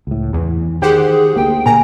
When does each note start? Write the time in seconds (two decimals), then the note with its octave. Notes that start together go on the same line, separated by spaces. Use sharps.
0.07 C#2 A2
0.33 E2 E3
0.82 D#3 G4 G#4 C5 F#5
1.36 D2 A#3 G5
1.66 A#2 G#5 A#5